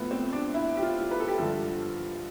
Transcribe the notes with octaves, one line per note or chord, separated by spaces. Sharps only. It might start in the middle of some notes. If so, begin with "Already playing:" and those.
Already playing: A2 F3 A3 B3
C4
D4
E4
G4
F4
B4
A4
G4
G2 D3 F3 A4